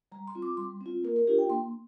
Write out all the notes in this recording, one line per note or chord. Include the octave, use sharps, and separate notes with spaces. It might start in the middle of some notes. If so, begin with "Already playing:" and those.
G3 A#5
C6
C4 F4
D6
G3 C6
C4
F4
A#3 A#4
A#4
D4 F4 G4
G5
A#3 C6